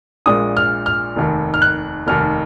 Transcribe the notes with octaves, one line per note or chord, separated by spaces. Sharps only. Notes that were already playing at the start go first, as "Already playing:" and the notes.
A#1 A#2 G#3 D#6
F6
F6
F1 D#2 D#3
F6
F#6
F1 D#2 D#3 F6